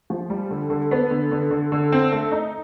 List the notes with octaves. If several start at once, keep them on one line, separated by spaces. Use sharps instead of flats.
F3
G3
D3
D3
B3
D3
D3
D3
D3
C4
A3
D#4